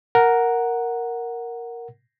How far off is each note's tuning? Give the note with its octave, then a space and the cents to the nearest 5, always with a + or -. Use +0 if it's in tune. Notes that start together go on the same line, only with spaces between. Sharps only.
A#4 +0 F#5 +0